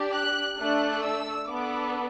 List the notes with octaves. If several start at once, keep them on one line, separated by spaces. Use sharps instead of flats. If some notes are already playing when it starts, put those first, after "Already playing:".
Already playing: D4 G4
F#6
A3 D4 A4 F#6
E6
B3 D4 A4 D6